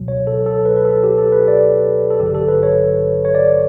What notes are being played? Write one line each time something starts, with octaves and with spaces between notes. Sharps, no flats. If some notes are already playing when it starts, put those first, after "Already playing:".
Already playing: C#2 B2 F#3
C#5
A4
A4
B4
B4
A4
G4
A4
B4
D5
A4
A1 G2 D3 F#3 G4
A4
B4
C#5
C#5
D5